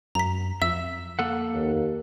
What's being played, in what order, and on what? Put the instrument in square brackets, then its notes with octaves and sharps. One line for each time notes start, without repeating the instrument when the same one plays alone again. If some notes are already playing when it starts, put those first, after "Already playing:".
[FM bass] F#2 [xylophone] A#5 B6
[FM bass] F2 [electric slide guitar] E5 [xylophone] E6
[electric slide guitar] A#3 A4 F#5
[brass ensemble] D#2